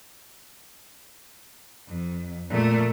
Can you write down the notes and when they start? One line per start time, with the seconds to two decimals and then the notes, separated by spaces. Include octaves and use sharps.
1.87 F2
2.50 A#2 A3